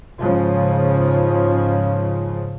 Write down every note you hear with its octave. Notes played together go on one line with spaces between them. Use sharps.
G#2 C#3 F3